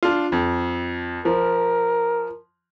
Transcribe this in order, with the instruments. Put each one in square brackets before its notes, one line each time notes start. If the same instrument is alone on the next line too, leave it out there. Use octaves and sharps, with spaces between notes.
[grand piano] D4 F4
F2
[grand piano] F3 [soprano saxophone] A#4